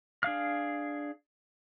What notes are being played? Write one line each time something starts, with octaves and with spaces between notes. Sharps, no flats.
D4 G#4 F5 F6